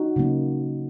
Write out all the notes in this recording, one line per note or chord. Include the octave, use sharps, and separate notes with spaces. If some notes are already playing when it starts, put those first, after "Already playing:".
Already playing: D#4 F#4
C#3 F#3 A#3